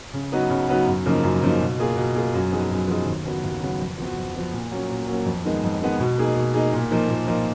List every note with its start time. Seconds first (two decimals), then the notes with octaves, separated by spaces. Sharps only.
0.14 C#3
0.32 F#3 B3 D#4 F#4
0.50 C#3
0.69 F#3 B3 D#4 F#4
0.87 F#2
1.06 C#3 F3 A#3 D#4
1.23 F#2
1.41 C#3 F3 A#3 D#4
1.61 B2
1.79 A#3 F4 G#4
1.97 B2
2.15 A#3 F4 G#4
2.34 F#2
2.52 F3 B3 D#4 G#4
2.70 F#2
2.88 F3 B3 D#4 G#4
3.06 D#2
3.25 C#3 F#3 B3 F#4
3.44 D#2
3.61 C#3 F#3 B3 F#4
3.80 F2
3.98 F3 B3 F#4
4.17 F2
4.35 F3 B3 F#4
4.54 A#2
4.71 F#3 A#3 C#4
4.90 A#2
5.08 F#3 A#3 C#4
5.26 F2
5.45 D#3 G#3 B3
5.63 F2
5.82 D#3 G#3 B3
6.00 B2
6.18 A#3 D#4 G#4
6.36 B2
6.54 A#3 D#4 G#4
6.73 A#2
6.91 F3 A#3 D#4
7.09 A#2
7.27 F3 A#3 D#4